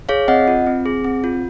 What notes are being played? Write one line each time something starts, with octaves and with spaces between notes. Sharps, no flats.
G#4 C#5 F5
C4 D#5 F#5
F4
C4
G#4
C4
F4